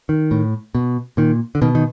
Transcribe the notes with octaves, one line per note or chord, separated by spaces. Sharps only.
D#3
A2
B2
A#2 D#3
D3
B2 D#3
D#3